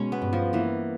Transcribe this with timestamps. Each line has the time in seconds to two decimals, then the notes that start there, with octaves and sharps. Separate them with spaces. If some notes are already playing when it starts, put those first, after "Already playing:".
Already playing: B2 G#3 C#4
0.12 B3
0.22 G2
0.33 F3
0.53 E3 A#3